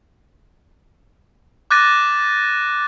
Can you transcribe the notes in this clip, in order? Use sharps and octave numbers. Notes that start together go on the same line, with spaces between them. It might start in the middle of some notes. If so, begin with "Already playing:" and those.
D6 F#6 G6 A6 A#6 D#7